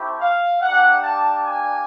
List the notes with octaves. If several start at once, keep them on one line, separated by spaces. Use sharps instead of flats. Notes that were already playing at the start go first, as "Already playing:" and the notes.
Already playing: A3 C4 E4 G4
F5
A#3 D4 G4 F#5
A5
G#5